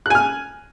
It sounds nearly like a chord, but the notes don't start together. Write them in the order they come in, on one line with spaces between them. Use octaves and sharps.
F#6 G#5 F6